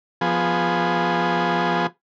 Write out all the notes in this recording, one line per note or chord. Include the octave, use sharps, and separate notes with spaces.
F3 B3 G#4